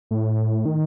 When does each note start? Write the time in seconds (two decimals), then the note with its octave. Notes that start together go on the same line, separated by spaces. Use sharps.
0.11 A2
0.65 D#3